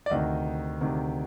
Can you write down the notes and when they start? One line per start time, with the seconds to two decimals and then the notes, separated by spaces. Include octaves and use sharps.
0.06 D5
0.10 D2 C3 D#3 D#5
0.81 D2 C3 D#3